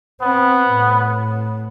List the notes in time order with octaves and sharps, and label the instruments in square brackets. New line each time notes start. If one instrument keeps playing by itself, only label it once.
[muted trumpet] B3 [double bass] C4
[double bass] A2